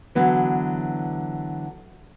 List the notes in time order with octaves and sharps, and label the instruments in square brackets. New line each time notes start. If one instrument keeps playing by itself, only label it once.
[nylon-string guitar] D3 E3 F#3 B3